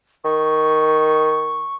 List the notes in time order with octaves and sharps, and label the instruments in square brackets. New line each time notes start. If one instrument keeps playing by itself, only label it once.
[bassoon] D#3 [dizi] C#6